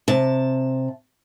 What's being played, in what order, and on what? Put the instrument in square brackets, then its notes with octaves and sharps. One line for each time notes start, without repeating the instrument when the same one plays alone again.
[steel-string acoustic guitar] C3 A5